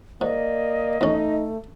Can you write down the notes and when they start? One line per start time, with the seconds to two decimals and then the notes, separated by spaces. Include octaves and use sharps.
0.21 G#2 A#3 D5 D#5
1.01 E2 A3 C#4 D#4